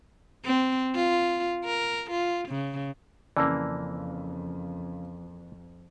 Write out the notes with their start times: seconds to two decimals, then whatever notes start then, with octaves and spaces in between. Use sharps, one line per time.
0.45 C4
0.95 F4
1.65 A#4
2.11 F4
2.49 C#3
3.37 F2 C#3 E3 A#3 D5 A5 E6